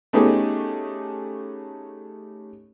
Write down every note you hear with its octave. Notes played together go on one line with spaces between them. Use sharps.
A3 B3 C#4 D#4 G4 G#4